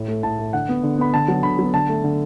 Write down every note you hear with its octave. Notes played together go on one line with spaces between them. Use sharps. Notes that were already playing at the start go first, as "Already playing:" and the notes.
Already playing: A2
A3
A2 A5
A3
D3 F#5
B3
D3
B3 B5
D3 A5
F#3 B3
D3 B5
F#3 B3
D3 A5
A3
D3